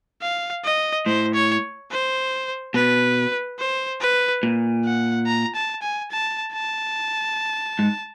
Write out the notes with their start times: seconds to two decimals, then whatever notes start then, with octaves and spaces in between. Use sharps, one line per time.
0.22 F5
0.65 D#5
1.06 A2 C5
1.34 C#5
1.91 C5
2.74 B2 B4
3.59 C5
4.01 B4
4.43 A#2
4.85 F#5
5.27 A#5
5.55 A5
5.82 G#5
6.11 A5
6.53 A5
7.79 G#2